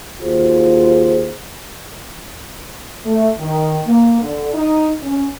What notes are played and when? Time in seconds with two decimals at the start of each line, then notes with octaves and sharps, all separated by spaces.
0.21 D#2 F4 F#4 G#4 C5
3.06 A3
3.39 D#3
3.87 A#3
4.22 D3
4.54 D#4
5.03 C#4